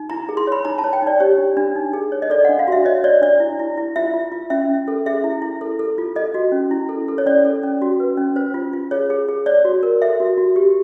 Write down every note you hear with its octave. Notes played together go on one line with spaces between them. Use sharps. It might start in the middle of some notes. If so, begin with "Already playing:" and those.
Already playing: D#4
E4 A#5
G#4
C6
C#5 B5
D#4 A#5
A5
C#5
G5
D#4 D5
G4 C#5
D4
D4
D#4
G#4
C#5
D#5
A4 D5
D4 F#5
F5
F#4 E5
C#5 D#5
C#5 D5
D4 D5
E4
E4
E4
F4 E5
F4
F4
C#4 E5
C#4
A4
G#4 E5
E4
E4
A4
A4
F4
A4 D#5
F#4
C#4
E4
A4
A4
C#5
C#4 D5
A4
C#4
F#4
B4
C#4
C5
F4
F4
G#4 C#5
G#4
G#4
C#5 D5
F#4
A#4
A4 E5
F#4
F#4
G4